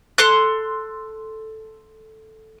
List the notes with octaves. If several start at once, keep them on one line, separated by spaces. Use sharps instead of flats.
A4 C6 F#6